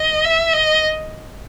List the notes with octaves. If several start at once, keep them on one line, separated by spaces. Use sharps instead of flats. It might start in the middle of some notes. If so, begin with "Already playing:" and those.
Already playing: D#5
E5
D#5